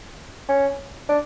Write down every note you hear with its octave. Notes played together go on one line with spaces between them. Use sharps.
C#4
D4